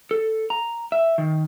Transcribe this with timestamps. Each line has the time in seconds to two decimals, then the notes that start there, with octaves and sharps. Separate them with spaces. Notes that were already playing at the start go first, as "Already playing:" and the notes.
0.11 A4
0.50 A#5
0.92 E5
1.18 D#3